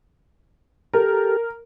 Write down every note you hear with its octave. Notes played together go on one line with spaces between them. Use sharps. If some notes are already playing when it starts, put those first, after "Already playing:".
G4 A4 A#4